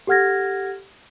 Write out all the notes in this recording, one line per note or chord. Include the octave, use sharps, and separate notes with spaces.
G4 A4 F#5 F6 G#6 A#6